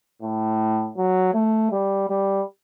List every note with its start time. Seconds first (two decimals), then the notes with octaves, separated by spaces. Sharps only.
0.22 A2
0.97 F#3
1.34 A3
1.72 G3
2.10 G3